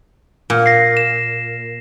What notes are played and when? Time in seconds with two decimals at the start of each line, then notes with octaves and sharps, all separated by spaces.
0.50 A#2
0.66 A#6 C7
0.97 E7